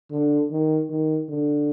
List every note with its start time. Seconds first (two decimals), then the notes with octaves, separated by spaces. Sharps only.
0.11 D3
0.50 D#3
0.89 D#3
1.29 D3